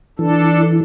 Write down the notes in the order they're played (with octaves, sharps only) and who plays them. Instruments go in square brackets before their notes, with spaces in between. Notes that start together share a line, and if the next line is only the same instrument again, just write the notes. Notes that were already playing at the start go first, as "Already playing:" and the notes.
[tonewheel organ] E3 [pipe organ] D4 A4